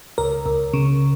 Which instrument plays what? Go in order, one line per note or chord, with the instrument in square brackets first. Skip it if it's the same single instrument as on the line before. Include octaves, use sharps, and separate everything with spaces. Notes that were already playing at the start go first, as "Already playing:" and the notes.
[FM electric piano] C#2 A#4
C#2
C#3